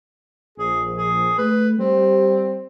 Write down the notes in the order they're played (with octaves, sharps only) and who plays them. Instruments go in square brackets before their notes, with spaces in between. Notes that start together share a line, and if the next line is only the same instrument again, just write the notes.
[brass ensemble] A#1 [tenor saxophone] G#4
[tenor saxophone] G#4
[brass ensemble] A3 [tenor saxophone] B4
[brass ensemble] G3 [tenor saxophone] C4